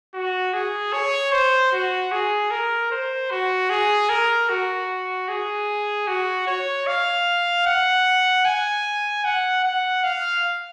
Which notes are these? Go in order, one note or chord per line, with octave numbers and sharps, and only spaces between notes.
F#4
G#4
C#5
C5
F#4
G#4
A#4
C5
F#4
G#4
A#4
F#4
G#4
F#4
C#5
F5
F#5
G#5
F#5
F#5
F5